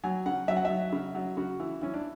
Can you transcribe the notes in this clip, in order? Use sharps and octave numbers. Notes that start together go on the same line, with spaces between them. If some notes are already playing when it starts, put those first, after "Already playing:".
F#3 G#5
C#3 F#5
F#3 E5
F#5
E5
F#3
C#3
F#3
C#3 F#4
E3
E3 C#4
D4